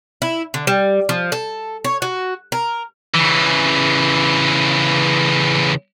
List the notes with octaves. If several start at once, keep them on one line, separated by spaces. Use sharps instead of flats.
E4
D3
G3
F3
A4
C#5
F#4
A#4
C#3 E3